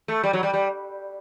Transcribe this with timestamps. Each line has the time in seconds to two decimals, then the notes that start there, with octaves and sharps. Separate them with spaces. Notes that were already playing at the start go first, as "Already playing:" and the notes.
0.08 A3
0.24 G3
0.33 F#3
0.43 G3
0.53 G3